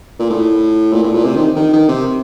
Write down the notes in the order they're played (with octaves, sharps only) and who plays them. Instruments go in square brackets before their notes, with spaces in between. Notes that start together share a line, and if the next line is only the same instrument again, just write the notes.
[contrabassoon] A#2
A2
A#2
A2
A#2
C3
D#3
D#3
D#3
C3